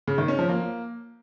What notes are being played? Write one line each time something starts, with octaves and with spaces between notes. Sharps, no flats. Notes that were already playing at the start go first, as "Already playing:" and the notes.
C#3
D#3
C#4
F3
A#3